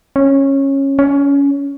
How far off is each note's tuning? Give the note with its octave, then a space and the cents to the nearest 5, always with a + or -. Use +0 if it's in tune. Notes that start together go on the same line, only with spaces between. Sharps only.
C#4 -15
C#4 +20